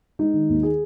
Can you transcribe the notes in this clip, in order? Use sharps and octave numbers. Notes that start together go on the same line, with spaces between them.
G#3 D#4
D#3
D#2
G#4